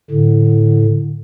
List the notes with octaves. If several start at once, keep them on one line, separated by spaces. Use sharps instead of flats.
A2 D3